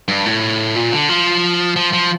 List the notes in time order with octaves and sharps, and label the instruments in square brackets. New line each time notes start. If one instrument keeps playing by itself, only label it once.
[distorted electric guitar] G2
A2
A#2
D3
F3
F3
F3